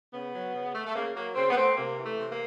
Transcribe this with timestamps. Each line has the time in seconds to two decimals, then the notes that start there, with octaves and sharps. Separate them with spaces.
0.12 C#3 B3
0.33 F#3
0.53 C#3
0.74 A3
0.86 A3
0.94 C#3 A#3
1.15 F#3 A#3
1.35 C#3 C4
1.51 B3
1.56 A3 C4
1.77 C3 A#3
1.97 E3
2.04 A3
2.18 C3
2.32 A#3